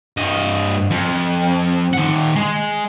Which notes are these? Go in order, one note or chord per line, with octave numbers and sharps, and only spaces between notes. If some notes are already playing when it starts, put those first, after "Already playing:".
G2 D#5
F2
D#3 F#5
G#3